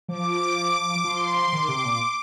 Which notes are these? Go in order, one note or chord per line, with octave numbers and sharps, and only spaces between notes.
F3 D6
F3 C6
D#3 D6
C3
A#2